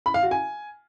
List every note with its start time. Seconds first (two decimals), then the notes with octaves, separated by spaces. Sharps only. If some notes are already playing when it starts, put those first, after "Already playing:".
0.06 B5
0.14 F5
0.23 F#4
0.31 G#5